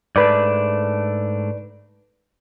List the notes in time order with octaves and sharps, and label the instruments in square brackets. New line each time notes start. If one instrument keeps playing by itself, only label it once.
[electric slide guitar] G#2 A3 D4 [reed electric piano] B4 D5